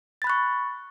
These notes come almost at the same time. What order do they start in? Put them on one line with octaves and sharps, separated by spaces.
A6 B5 F#6 C#6